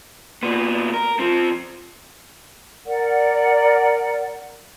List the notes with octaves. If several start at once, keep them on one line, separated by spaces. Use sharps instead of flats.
A#2 B3
A#4
F3 C4
A#4 D5 F#5